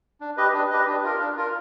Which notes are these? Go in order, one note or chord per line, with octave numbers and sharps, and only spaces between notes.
D4
G4 B4 D#5
D4
G4 B4 D#5
D4
F4 A#4
D4
F4 A#4